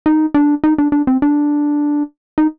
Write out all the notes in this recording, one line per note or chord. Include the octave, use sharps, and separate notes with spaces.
D#4
D4
D#4
D4
D4
C4
D4
D#4